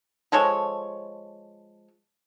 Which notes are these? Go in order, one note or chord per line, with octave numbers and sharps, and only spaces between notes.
F3 G#3 A4 C#5